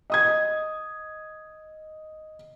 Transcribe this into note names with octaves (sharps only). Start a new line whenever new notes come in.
D#5 D#6 G#6